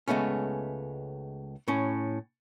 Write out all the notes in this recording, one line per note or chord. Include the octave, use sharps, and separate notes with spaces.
C#2 G#3 A3 B3 C#4
A2 C#4